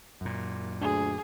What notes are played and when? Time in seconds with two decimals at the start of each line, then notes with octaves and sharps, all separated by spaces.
0.21 F#2 A#2
0.81 D2 G#4